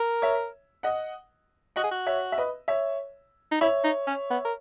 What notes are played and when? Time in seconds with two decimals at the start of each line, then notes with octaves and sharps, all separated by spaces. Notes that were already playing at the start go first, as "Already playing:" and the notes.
Already playing: A#4
0.22 C#5 E5
0.83 D#5 F#5
1.76 F#4 D#5 F#5
1.84 G#4
1.91 F#4
2.06 C#5 E5
2.32 E5
2.38 B4 D#5
2.68 C#5 E5
3.51 D#4
3.61 E4 C#5 E5
3.84 D#4
4.07 C#4
4.30 B3
4.45 A#4